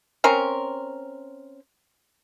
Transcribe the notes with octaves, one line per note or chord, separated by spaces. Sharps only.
C4 C#4 A#4